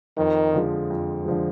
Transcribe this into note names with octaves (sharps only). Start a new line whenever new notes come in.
F2 D#3
D3 F3 G#3
F2
D3 F3 G#3